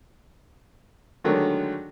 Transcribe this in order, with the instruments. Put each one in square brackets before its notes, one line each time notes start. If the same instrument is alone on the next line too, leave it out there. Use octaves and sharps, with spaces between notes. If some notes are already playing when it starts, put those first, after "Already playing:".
[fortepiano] D3 D#3 F#3 G#3 A3 D4